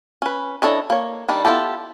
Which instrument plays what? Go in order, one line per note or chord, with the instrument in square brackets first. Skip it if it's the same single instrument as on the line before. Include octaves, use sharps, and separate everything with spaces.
[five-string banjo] C#4 B4
E3 D4 A4 C#5 D#5
A#3 C#5
D#3 G3 D4
B3 E4 F4 G4 A4